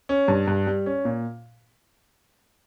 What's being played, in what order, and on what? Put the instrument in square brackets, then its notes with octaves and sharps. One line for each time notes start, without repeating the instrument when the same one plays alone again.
[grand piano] C#4
G2
G2
G3
C#4
A#2